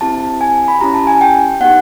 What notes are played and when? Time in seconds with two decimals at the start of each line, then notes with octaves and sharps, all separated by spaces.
0.01 C4 E4 G4 A5
0.41 G#5
0.68 B5
0.81 C#4 E4 G4 A#5
0.94 A5
1.07 G#5
1.21 G5
1.61 B3 D#4 G4 F#5